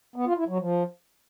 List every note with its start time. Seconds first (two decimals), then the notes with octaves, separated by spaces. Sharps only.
0.16 B3
0.27 F4
0.38 E4
0.48 F#3
0.59 F3